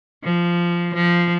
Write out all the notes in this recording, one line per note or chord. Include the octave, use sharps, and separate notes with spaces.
F3
F3